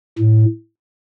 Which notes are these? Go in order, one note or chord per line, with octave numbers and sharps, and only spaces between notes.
A2